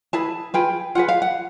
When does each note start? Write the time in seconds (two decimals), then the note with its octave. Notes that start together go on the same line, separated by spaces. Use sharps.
0.13 E4 G#4 B4 A5
0.54 F4 G#4 B4 G5
0.95 F4 G#4 B4 F#5
1.08 F5
1.22 F#5